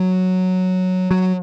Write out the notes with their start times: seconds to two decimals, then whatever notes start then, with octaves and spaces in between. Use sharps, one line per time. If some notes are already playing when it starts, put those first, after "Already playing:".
Already playing: F#3
1.11 F#3